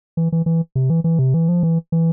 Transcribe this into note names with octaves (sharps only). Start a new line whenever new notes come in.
E3
E3
E3
C3
E3
E3
C3
E3
F3
E3
E3